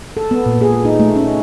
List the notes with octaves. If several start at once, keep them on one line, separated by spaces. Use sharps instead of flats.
A4
B3
A#2
G#4
D#4
A3
C#4